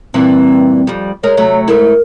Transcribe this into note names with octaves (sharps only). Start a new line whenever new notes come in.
G2 A#2 E3 C4
F2 G3
G#3 A#4 C#5
C3 F#3 A3
G#2 A3 E4 A#4